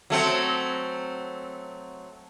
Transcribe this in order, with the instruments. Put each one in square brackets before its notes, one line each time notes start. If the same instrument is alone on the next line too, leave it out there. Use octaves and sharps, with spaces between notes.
[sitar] F#3 A3 C4